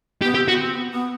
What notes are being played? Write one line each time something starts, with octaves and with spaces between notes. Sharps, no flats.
B3 G4
C4 G4
B3 F#4
C4
B3
B3